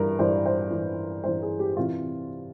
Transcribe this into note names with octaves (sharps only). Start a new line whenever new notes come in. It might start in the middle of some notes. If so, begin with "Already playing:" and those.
Already playing: G2 E3 A#4
G2 E3 C5
C5
G2 E3
G2 E3 C5
G#4
G4
C3 E3 F4